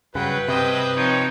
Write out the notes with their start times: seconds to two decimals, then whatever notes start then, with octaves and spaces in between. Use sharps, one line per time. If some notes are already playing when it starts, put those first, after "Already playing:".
0.15 G2 C#3 F#3 B4 F#5 G5
0.48 G2 C3 C5 D#5 G5
0.96 F3 C4 D#4 C#5 G5